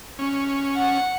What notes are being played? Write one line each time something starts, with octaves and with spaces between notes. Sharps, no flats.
C#4
F#5